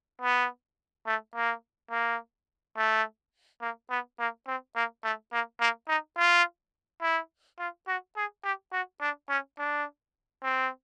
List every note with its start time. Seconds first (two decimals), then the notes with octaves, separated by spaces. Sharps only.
0.21 B3
1.07 A3
1.35 A#3
1.91 A#3
2.77 A3
3.61 A#3
3.90 B3
4.19 A#3
4.47 C4
4.75 A#3
5.04 A3
5.32 A#3
5.60 A#3
5.88 D#4
6.17 F4
7.02 E4
7.59 F4
7.88 F#4
8.16 G#4
8.44 G4
8.72 F#4
9.01 D4
9.29 C#4
9.58 D4
10.43 C4